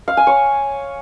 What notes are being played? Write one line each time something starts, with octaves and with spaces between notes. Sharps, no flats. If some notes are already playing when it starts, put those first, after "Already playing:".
F5
G#5
C#5